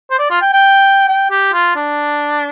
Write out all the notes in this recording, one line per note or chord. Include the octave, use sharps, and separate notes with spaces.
C5
D5
F4
G5
G5
G5
G4
F4
D4